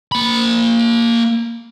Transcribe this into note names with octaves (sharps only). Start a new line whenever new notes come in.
A#3 B5